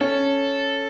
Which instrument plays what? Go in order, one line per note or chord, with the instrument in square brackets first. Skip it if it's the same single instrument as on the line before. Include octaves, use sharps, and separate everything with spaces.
[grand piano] C#4 [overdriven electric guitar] A4